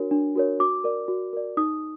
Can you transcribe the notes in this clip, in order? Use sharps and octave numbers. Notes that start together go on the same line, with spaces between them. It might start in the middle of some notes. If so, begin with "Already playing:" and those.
Already playing: D4 F#4 A#4 C#5
D4
F#4 A#4 C#5
F#4 D6
A#4 D5
F#4
A#4 D5
D#4 D#6